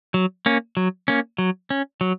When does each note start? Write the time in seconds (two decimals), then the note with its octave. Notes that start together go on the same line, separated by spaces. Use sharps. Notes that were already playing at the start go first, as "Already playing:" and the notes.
0.14 F#3
0.46 A#3 C#4
0.77 F#3
1.08 A#3 C#4
1.38 F#3
1.70 C#4
2.01 F#3